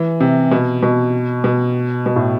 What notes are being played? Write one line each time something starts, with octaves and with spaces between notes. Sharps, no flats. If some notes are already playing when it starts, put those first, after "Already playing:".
Already playing: E3
C3
B2
B2
B2
B2
A2